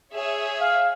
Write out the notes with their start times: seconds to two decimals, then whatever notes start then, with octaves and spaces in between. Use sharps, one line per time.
0.14 G#4 C#5 E5
0.61 F5